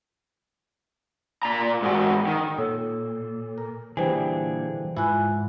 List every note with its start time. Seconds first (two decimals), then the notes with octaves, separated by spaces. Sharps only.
1.43 A#2 A#5
1.82 G#2 F#4
2.27 D#3
2.58 A#2 A4 C#5 E6
3.58 A#4
3.97 A#2 D3 E3 G3 G#4 C5 G5
4.97 G#2 E4 F4 B4 G#5 F#6